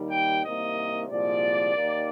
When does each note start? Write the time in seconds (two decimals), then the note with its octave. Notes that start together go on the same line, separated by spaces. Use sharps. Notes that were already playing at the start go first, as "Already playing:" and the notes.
Already playing: D#2 D#3 G3
0.10 G5
0.43 C2 C3 D#3 A#3 D#5
1.09 C2 A#2 F3 G#3 D5
1.75 D#2 D#3 A#3